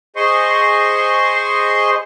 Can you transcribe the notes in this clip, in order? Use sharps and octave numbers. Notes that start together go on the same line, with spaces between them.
G#4 C5 D#5 C6 C#6